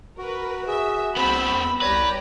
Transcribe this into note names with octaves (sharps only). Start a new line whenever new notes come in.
F#4 A#4 B4
G#4 E5
C2 B3 C4 B5 E6
E2
C2 G4 B4 C#5 D5 A#5